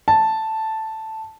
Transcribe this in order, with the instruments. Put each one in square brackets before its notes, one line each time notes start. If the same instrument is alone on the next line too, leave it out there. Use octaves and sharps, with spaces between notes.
[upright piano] A5